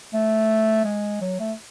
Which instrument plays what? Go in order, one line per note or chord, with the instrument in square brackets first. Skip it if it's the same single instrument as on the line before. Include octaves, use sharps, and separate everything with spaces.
[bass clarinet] A3
G#3
F#3
A3